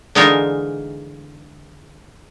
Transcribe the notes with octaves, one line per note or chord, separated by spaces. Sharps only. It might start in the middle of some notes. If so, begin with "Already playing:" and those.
D3 E3 G#3 D#4 F4 A#4